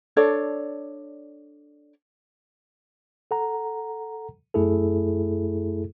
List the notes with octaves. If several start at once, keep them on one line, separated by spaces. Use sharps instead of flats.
D4 A4 C#5 D5
A4 F#5 A#5
F#2 A3 E4 G#4 A4